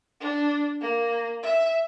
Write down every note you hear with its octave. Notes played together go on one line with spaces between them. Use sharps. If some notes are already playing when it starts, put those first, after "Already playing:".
D4
A#3
E5